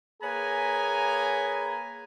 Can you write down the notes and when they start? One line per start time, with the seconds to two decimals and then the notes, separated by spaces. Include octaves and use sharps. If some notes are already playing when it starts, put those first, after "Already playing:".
0.22 A#3 G#4 B4 C#5 G#5 A#5